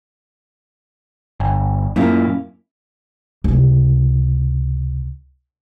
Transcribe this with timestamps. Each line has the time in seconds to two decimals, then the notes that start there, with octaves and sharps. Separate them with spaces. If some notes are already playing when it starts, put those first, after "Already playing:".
1.40 G1
1.96 F#2 A#2 A#3 C#4 E4
3.44 C#2 C3